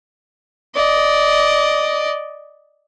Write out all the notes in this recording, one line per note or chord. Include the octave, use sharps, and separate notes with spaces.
D5 D#5